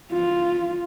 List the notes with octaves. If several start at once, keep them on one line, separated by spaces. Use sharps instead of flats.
F4